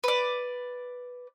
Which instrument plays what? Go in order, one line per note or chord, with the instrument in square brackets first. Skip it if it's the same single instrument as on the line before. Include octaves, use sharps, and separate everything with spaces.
[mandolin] B4 D5